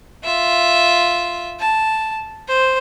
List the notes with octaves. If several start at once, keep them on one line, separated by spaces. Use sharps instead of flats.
F4 E5
A5
C5